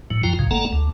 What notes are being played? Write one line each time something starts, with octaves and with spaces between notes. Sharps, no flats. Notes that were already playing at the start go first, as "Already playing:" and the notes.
A2 F#3
F#2 F3 F4 G5 A#5
A#1 G#2 C#3
G1 A3 A#3 A4 F#5 A#5
D2